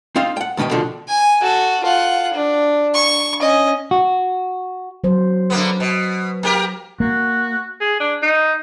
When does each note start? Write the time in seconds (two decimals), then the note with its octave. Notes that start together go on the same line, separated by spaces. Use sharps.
0.16 C4 D#4 F4 F5
0.37 F#5 G5
0.57 D2 B2 D#3 B4 G5
0.71 B2 D3 D#3 F3
1.08 G#5
1.41 F#4 A4
1.83 F4 F#5
2.33 D4
2.94 C#6
3.41 C#4 D#5
3.91 F#4
5.04 F#3 C5
5.50 D3 A#3 B3
5.80 B2
6.43 A#3 G4 A#4
7.00 A#3 F#4
7.81 G#4
8.00 D4
8.22 D#4